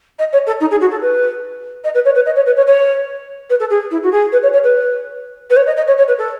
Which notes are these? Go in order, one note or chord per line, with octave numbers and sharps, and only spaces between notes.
D#5
C#5
A4
D#4
G#4
F#4
A4
B4
D#5
B4
C#5
B4
D#5
C#5
B4
C#5
C#5
B4
A4
G#4
E4
F#4
G#4
B4
C#5
C#5
B4
B4
C#5
D#5
D#5
C#5
C#5
B4
A4